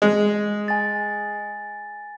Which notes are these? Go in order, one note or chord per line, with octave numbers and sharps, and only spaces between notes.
G#3
G#5 A6